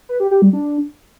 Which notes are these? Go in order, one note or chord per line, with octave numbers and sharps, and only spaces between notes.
B4
G4
G4
G3
D4